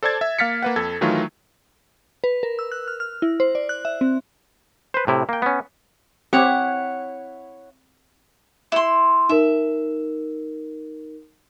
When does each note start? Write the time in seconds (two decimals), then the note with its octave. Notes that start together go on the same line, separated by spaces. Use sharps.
0.03 A4 C5 D5 A5 G#6 A6
0.21 E5
0.39 A#3 F5 F6 A6 B6 C#7
0.63 A#3 B4 F#5
0.76 F2 A4 G#6
1.01 D#3 E3 F#3 A3 D#4 F4
2.24 B4
2.43 A#4
2.59 E6
2.72 F#6
2.88 F6
3.00 F6
3.22 E4
3.40 C5
3.55 D5
3.69 F#6
3.85 E5
4.01 C4
4.94 B4 C5
5.07 A2 C3 E4
5.29 A#3 G5
5.42 B3 C#4
6.33 C4 E4 G4 C#5 F#5
8.72 E4 C6
9.29 D#4 A#4 E5